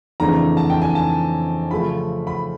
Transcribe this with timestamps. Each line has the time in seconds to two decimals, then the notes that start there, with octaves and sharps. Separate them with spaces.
0.20 F2 C#3 E3 A3 D4 A#5
0.57 A5
0.70 G5
0.82 G#5
0.95 A5
1.70 C#3 F3 A3 B5
2.27 B5